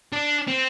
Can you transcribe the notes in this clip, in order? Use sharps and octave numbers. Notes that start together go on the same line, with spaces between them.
D4
C4